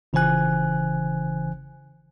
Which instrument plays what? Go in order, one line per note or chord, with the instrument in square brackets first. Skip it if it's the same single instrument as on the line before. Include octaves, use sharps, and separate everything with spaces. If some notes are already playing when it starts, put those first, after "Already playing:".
[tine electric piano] G1 C#3 E3 C5 G#5 F#6